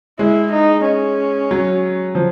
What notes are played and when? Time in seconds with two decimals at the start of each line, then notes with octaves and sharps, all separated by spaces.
0.19 G#3 E4
0.52 D#4
0.86 C#4
1.51 F#3
2.15 F3